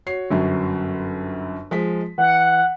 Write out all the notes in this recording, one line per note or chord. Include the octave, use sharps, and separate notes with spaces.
F#4 C#5 C7
G1 F#2 F#3
F3 G#3 B6
E3 F#5